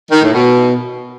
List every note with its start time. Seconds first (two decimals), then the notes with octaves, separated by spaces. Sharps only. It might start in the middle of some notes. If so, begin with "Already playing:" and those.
0.11 D#3
0.22 A2
0.34 B2